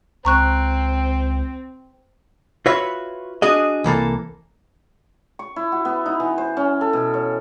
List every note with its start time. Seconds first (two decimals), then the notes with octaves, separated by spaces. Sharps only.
0.25 C#2 C4 A#5 C#6 F#6
2.66 F4 F#4 B4 C#5 E5
3.42 D4 F#4 G#4 D#5
3.84 C2 E3 A#3 A4
5.39 C#6
5.56 E4
5.72 F#4
5.85 B3
6.06 D#4
6.20 E3
6.38 C5
6.57 C#4
6.81 A4
6.93 B2
7.14 C#5